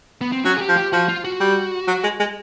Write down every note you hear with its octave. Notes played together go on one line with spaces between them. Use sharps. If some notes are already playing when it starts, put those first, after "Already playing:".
B3
C4
F#3 C#4
G#4
G4
F3
G4
F3 F#4
F4
F#4
G3
F#3
G#3
G#3